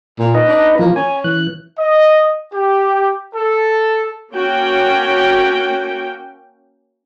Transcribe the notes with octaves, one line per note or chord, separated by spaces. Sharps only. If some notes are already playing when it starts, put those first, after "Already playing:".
A#2
D#4 B4 D#5
D4
E3 F3 A#3 F4
C#4 G#5
E3 F#6
D#5
G4
A4
A#3 C#4 F#4 G5